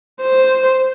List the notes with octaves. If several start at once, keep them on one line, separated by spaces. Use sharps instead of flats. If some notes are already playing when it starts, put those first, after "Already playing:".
C5